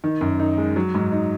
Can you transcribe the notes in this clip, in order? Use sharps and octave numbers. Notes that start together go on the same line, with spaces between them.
D#3
F#2
D#4
G#3
F#3
G#2
D#4